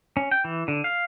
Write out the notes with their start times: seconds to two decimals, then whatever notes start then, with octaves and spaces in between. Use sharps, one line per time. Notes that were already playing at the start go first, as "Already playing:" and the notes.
0.17 C#4
0.31 G5
0.44 E3
0.68 D3
0.84 F5